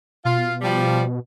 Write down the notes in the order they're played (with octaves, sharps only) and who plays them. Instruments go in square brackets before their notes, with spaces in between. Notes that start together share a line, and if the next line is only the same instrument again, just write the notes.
[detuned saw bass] B2 [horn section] F4
[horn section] F3 G3